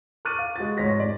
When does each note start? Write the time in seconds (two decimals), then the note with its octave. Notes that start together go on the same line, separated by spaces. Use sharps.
0.25 C#6 D6 F6 F#6 A6 D#7
0.38 F5
0.56 G#3 F#4 A6
0.77 F1 G#2 C#5 C6 A#6 B6
1.00 D5